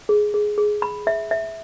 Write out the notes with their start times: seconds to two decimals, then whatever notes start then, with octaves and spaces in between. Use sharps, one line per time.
0.09 G#4
0.34 G#4
0.58 G#4
0.82 B5
1.07 E5
1.31 E5